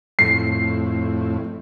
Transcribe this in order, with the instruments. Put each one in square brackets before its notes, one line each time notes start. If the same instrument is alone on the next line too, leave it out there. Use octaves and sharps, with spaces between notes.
[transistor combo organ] F2 A2 [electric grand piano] C7